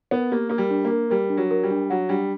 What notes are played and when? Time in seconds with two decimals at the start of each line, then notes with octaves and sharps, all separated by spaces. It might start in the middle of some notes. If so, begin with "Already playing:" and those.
0.11 B3 A#4
0.32 A#3 G4
0.49 A#3 A#4
0.58 G3
0.70 D4
0.85 A#3
0.91 A#4
1.10 G3 A#4
1.30 D4
1.37 F#3
1.51 A#4
1.64 G3
1.71 D4
1.90 F#3 F#5
2.09 G3 D4